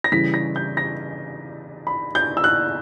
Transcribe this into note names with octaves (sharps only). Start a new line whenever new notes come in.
A#6
C#3 E3 G3 B6
A#6
G6
A#6
B5
G6
E6
F#6